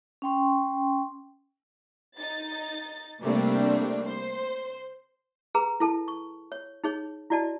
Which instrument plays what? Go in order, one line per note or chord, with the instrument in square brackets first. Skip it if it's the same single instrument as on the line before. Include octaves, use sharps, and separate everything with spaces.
[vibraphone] C#4 G5 C6 C#6
[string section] D#4 A6
C3 G3 A3 A#3 C4 D4
C5
[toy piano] G#4 B4 A#5
E4 A4 A5
C#6
C#5
D#4 G#4 C#5
E4 F#4 D5 D#5 A5